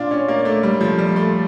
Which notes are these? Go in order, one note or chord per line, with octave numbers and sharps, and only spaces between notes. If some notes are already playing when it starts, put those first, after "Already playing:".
Already playing: A#2 D4 F4
C#4
A#3
A3
G3
F3
G3
A3